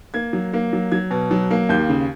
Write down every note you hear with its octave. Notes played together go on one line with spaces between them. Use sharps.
A#3 G#6
F#3
A#3
F#3
F#3 G#6
B2
F#3
A#3
D#2 G6
C#3